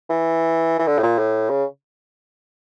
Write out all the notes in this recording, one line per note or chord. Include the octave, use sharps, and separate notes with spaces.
E3
E3
D3
A2
A#2
A2
C#3